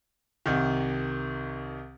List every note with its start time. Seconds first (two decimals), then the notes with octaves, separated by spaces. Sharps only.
0.46 C2 C3 D#3